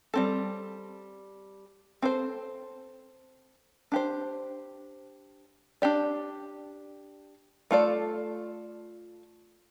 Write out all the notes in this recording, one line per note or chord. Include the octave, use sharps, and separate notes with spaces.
G3 C4 A4
C4 A4 C5
D4 G4 C5
D4 G4 D5
A3 F4 A4 D5